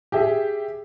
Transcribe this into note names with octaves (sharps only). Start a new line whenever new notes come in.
G4 G#4 E5